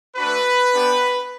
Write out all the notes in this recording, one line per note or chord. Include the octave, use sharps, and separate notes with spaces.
A3 D4 F#4 B4
B3 D4 G4